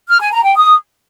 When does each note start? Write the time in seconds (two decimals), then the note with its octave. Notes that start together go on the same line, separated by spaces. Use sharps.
0.09 F6
0.20 G#5
0.32 A#5
0.44 G5
0.55 D#6